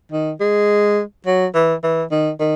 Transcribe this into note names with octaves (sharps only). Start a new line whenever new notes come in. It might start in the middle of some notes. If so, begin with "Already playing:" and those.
D#3
G#3
F#3
E3
E3
D#3
D#3